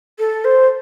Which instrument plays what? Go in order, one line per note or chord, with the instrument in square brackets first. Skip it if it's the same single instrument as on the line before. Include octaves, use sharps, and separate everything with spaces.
[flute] A4
C5